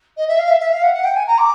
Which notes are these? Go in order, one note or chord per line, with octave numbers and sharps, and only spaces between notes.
D#5
E5
F5
E5
E5
F5
F#5
F#5
G5
G#5
A#5
D6